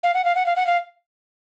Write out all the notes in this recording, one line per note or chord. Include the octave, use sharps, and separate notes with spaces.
F5
F#5
F5
F#5
F5
F#5
F5